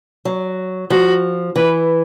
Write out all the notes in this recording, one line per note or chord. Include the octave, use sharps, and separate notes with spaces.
F#3
F3 F#4
E3 B4